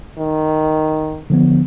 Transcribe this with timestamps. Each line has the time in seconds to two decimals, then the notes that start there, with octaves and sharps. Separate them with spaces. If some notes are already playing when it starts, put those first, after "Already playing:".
0.18 D#3
1.30 D3 F3 B3